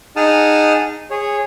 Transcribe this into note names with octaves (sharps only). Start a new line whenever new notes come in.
D#4 G#4 F#5 A5 D#6 F6
G#4 C#5